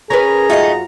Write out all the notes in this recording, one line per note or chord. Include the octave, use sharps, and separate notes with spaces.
C#4 G#4 A#4 B4 A#5
F#2 A3 D#4 F4 F#4 D#5